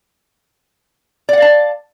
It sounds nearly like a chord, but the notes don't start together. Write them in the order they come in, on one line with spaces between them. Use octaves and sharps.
D5 F#5 F5 A5